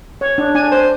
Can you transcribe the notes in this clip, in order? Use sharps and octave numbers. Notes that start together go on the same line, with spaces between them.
C#5
D4
D4 G#5
C5